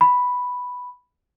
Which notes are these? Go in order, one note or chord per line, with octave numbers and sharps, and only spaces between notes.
B5